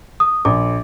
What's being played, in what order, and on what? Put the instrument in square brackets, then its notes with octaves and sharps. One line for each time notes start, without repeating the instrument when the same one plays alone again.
[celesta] D#6
[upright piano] A#1 [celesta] D6